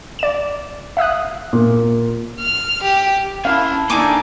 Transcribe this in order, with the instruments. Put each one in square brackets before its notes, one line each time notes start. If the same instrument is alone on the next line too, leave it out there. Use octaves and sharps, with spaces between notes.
[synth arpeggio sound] D5 E7
E5 F5 D#6 F#6
[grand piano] A#2
[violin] F6
G4
[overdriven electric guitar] C#4 A5 [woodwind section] E4 [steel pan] F5
[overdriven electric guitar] D#3 A#3 [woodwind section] D4 A4 [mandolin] D#4 G#5 D6